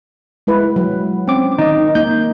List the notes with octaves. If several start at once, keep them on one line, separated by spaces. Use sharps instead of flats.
G#3 E4 B4
F#3
C4 C#4 D6
D#3 D#4 D#5
A#3 D#4 G6